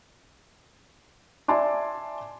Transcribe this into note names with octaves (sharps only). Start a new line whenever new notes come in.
D5 E5 G#5 A5 C6 D6